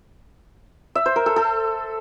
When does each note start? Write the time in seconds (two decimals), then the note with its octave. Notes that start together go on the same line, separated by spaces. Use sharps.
0.95 E5
1.06 C5
1.16 A#4
1.26 A4
1.36 A4